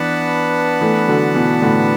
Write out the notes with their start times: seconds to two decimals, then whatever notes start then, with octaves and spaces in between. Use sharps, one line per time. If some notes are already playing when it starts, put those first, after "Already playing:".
Already playing: E3 B3 D4 B4 F#5 A5
0.81 E3 A3
1.08 D3 F#3
1.35 B2 E3
1.62 A2 D3